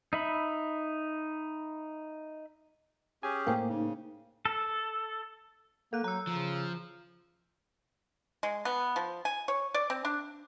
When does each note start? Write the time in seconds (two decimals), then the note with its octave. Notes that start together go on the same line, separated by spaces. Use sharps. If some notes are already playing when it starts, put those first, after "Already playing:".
0.13 D#4 E5 B5
3.23 C#4 G4 G#4 G#5
3.47 A2 A#3 C5 G5
3.68 C#3 D#4
4.45 A4
5.93 A#3 A4 F#6
6.04 F#3 A#5 E6
6.27 C#3 F3
8.43 G#3
8.65 B3
8.96 F3
9.25 G#5
9.48 C#5
9.74 D5
9.90 C4
10.05 D4